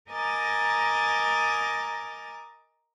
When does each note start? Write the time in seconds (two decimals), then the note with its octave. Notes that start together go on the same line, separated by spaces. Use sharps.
0.11 A#4 D#5 G#5 A#5 D6 A6